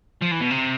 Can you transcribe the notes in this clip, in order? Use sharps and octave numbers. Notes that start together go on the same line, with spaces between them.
F3
E3
B2
C3